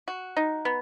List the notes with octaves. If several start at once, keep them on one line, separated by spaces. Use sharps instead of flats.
F#4
D#4
B3